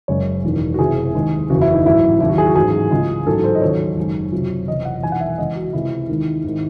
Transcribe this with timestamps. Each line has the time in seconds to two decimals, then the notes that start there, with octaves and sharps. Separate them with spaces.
0.08 F#1 F#2 C#3 G#3 C#5
0.44 E1 E2 D#3
0.74 F#4
0.79 F#1 E2 C3 E3 G#4
1.14 D#2 D#3 G#3
1.50 F#1 E2 C#3 F#4
1.61 E4
1.73 D#4
1.85 A1 G#2 D#3 F#3 E4
2.20 D#2 C#3 F#3 E4
2.30 F#4
2.38 G#4
2.47 F#4
2.56 A1 G#2 F#3 G#4
2.91 C#2 C#3 G#3
3.26 A1 G#2 F#3 A4
3.44 C5
3.55 D#5
3.61 D#2 C#3 F#3 C#5
3.97 F#1 F#2 D#3 G#3
4.32 C#2 C3 F#3
4.68 F#1 E2 C3 D#5
4.85 F#5
5.02 E1 E2 D#3 G#5
5.12 F#5
5.20 E5
5.38 E2 C#3 G#3 D#5
5.56 F#4
5.73 C#2 C3 E3 G#3 E4
6.09 D#2 D#3 G#3
6.44 G#1 D#3 G#3